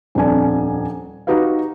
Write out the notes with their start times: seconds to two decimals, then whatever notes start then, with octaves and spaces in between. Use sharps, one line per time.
0.15 D#1 F2 D4 G#5
1.27 D#4 F#4 G4 B4 F5